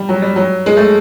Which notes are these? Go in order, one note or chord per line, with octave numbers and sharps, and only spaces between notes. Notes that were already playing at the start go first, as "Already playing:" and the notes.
Already playing: G3
F#3
G3
F#3
G#3
A3